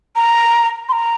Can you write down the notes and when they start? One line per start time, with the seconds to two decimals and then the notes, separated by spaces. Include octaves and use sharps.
0.16 A#5
0.89 C6
0.92 A#5